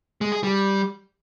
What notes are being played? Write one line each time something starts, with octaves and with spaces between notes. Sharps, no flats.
G#3
G#4
G3